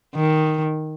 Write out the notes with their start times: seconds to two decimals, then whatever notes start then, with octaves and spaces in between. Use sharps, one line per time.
0.15 D#3